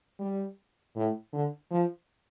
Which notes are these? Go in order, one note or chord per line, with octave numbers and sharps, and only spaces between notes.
G3
A2
D3
F3